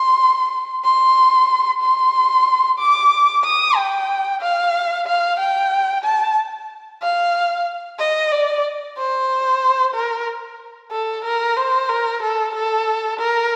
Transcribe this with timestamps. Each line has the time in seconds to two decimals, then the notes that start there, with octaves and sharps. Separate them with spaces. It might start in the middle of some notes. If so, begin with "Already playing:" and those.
Already playing: C6
0.84 C6
1.82 C6
2.79 D6
3.44 D#6
3.76 G5
4.42 F5
5.07 F5
5.39 G5
6.04 A5
7.02 F5
7.99 D#5
8.31 D5
8.97 C5
9.94 A#4
10.92 A4
11.25 A#4
11.57 C5
11.89 A#4
12.22 A4
12.55 A4
13.19 A#4